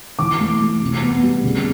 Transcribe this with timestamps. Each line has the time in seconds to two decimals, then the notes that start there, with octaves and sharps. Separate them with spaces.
0.19 E3 D6
0.40 A3
0.61 A3
0.81 C3
1.02 B3
1.23 G3
1.43 C#3